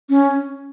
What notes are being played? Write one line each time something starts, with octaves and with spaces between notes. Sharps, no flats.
C#4